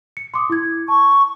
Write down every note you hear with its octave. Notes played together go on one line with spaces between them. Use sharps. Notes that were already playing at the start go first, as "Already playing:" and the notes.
C#7
C6 D6 D#6
E4 G#6
A5 C#6